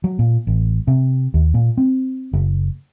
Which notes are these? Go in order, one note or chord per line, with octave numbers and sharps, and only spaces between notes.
F#3
A#2
A1
C3
D#2
A#2
C4
F#1